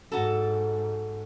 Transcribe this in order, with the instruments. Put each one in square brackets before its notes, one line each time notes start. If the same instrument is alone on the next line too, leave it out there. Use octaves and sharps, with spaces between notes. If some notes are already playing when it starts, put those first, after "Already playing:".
[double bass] G#2 [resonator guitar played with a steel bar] F#4 A4